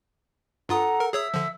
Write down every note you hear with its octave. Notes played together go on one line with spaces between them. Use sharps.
G2 F4 A4 F#5 A#5 D#6
A#4
G#4 C#5 E5 D#6 E6
D3 F3